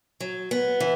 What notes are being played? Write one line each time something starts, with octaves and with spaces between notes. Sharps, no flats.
F#3
B3
E3